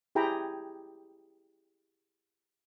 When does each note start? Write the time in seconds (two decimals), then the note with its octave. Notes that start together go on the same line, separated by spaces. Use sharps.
0.15 E4 G4 G#4 G5 A#5 B5